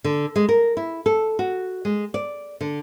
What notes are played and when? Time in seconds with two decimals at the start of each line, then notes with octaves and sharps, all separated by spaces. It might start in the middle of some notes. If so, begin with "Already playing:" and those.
0.04 D3
0.36 G#3
0.49 A#4
0.77 E4
1.06 A4
1.39 F#4
1.85 G#3
2.14 D5
2.61 D3